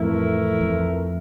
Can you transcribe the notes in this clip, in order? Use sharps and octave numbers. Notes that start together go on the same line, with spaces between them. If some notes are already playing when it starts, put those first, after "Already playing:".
Already playing: F2 A2 E3 A3 E4 A#4
F2